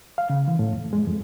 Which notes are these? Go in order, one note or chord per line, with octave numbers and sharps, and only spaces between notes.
F5
C#3
E3
A2
F2
G#3
F2